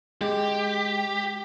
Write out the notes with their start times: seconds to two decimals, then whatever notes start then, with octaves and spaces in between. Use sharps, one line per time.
0.21 G#3 G4